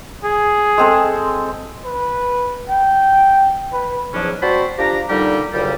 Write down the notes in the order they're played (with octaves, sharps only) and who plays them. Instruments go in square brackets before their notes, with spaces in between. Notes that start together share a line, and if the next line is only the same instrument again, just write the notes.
[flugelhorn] G#4
[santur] G#3 C4 A4
[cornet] B4
G5
B4
[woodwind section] E2 G#2 F3 F#3 C#4 D4
C4 F#4 C5 D5 A5 B5
F3 D4 G4 A#5
A#2 D3 G3 D#4 G4 A#4
D2 A#2 C#3 F#3 G3